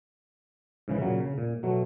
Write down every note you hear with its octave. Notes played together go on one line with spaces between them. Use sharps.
G#2 C#3 E3
A#2 C#3 F#3
C#3
A#2
B2 F#3 A3